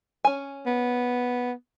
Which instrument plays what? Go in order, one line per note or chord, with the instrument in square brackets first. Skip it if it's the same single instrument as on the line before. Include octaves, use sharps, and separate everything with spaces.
[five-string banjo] C#4 G#5
[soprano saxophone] B3